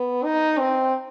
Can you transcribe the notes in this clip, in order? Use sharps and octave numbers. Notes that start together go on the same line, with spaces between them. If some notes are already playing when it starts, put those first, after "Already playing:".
Already playing: B3
D#4
C4